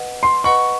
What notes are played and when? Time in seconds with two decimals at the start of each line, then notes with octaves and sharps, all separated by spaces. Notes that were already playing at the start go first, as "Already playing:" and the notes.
Already playing: B4 D#5 F#5
0.23 C6
0.44 B4 D#5 F#5 B5 C#6